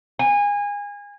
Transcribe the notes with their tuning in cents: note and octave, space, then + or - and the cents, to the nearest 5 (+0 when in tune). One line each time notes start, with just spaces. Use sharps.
G#5 -25